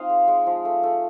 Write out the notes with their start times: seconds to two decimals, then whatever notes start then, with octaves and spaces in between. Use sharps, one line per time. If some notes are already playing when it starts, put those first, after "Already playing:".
Already playing: F3 C4 D#4 D#5 F5
0.10 G#3
0.28 G#3
0.47 F3
0.65 A3
0.83 A3